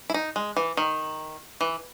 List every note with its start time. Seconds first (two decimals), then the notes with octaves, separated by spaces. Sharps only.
0.10 E4
0.14 D#4
0.36 G#3
0.56 E3
0.77 D#3
1.61 E3